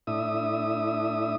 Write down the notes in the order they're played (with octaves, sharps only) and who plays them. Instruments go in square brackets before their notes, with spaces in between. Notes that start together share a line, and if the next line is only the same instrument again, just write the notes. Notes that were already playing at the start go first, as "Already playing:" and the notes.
[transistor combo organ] A2 D4 E4 E5 D#6